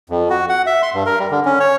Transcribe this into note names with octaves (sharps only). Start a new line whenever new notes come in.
F2
F#4
F#5
E5
C6
G2
A#4
G3
D3
C#4
C#5